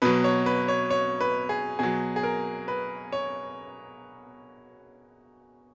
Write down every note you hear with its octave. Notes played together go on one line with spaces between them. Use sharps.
B2 F#3 B4
C#5
B4
C#5
C#5
B4
G#4
B2 F#3 G#4
G#4
A#4
B4
C#5